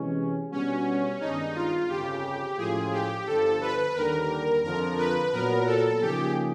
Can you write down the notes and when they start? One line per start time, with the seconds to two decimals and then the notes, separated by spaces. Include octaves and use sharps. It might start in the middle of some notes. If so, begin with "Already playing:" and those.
Already playing: C3 E3 G#3 C#4
0.52 B2 G3 B3 C#4 D4 F#4
1.21 G2 D#3 G#3 B3 D4 D#4
1.55 F4
1.89 G1 F2 C#3 G4
2.58 A2 F3 G#3 C#4 F4 G#4
2.92 G4
3.27 G1 G2 D3 F3 A4
3.61 B4
3.95 D#2 D3 G3 A#4
4.64 F2 D3 F3 A#4
4.98 B4
5.33 A#2 F#3 B3 A#4
5.67 A4
6.01 C#3 F3 A#3 D#4 G4 G#4